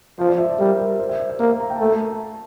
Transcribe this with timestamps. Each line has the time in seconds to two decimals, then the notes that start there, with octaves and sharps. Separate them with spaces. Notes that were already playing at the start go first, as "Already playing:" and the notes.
0.19 F3 C5
0.28 D5
0.38 E5
0.49 D5
0.59 G3 A#4
0.79 A#4
0.99 C5
1.09 E5
1.20 D5
1.30 E5
1.39 A#3 F5
1.50 F5
1.60 A#5
1.70 G5
1.76 A5
1.80 A3 A#5
1.90 A5
2.00 A#5
2.10 A5